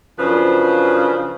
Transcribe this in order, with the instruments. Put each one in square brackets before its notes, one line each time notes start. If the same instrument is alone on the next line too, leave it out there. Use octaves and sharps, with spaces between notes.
[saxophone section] F#2 C#3 F3 D4 B4 C5